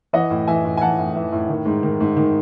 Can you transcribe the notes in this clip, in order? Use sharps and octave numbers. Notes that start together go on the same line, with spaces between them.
E3 D#5 F#5
A2
E3 E5 G#5
A2
G#5
E3 F#5 A5
A2
E3
A2
D#3
G#2
D#3
G#2
D#3